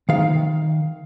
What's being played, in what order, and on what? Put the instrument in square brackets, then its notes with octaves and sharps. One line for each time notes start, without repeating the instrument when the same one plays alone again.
[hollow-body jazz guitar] D#3 F5